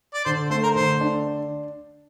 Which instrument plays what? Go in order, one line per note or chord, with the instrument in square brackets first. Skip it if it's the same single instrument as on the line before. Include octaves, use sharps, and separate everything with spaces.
[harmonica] D5
[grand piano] D3 [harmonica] C5
[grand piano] A3 [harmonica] C5
[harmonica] A#4
[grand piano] D3 [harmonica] C5
[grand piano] D4